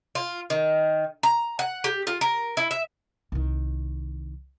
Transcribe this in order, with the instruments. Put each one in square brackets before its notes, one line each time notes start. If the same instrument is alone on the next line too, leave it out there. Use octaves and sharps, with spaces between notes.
[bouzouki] F4
D#3
A#5
F#5
G4
F4
A#4
E4
E5
[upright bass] C2 D#3